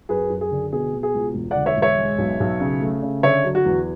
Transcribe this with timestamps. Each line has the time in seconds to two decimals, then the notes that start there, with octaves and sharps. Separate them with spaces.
0.09 F#2 G#4 B4
0.30 F#2
0.41 G#4
0.51 D3
0.72 B2 G#4
0.93 B2
1.03 G#4
1.14 C#2
1.35 E1
1.51 D3 D5 F#5
1.66 C#5 E5
1.77 E1
1.82 C#5 E5
1.98 G#3
2.19 B1
2.40 B1
2.60 C#3
2.82 A3
3.02 C#3
3.23 D3 C#5 E5
3.44 F#3
3.55 F#4
3.65 E2